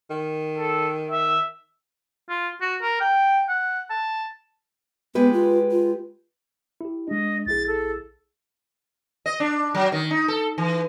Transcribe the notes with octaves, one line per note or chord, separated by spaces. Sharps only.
D#3
A4
E5
F4
F#4
A#4
G5
F#5
A5
G#3 B3 G4 B4
F4
F4
E4 G4
G#3 D4 D#5
A#1 E4 G#4 A6
A4
D#5
D4
F#3
D#3
D#4
A4
E3